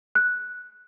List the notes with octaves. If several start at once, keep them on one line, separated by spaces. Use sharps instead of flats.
F#6